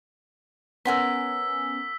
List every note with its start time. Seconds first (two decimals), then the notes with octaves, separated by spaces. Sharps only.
0.85 B3 C#4 A#4 F#5 G#5 C6 E6 B6